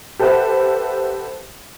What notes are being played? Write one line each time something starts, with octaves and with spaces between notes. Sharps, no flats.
G4 A4 B4 C5 E5 F#5